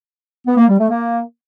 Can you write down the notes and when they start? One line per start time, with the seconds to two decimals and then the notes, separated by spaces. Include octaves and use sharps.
0.46 B3
0.57 A#3
0.68 G3
0.78 A3
0.89 A#3